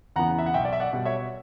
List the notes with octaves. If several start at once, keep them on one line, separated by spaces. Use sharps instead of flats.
E2 C#3 E3 B3 F#5 A#5
E5
F#5
B1 E5 G5
D5
E5
D5 F#5
B2 G3
C#5 E5